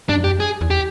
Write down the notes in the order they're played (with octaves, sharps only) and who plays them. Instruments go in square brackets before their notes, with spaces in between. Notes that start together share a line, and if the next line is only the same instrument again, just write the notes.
[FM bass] G2 [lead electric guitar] D4
[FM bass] F#2
[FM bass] F2 [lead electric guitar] G4
[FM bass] F#2
[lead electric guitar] G#4
[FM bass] E2
[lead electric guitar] G4